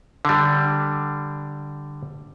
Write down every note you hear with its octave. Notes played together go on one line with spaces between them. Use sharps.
D3 G3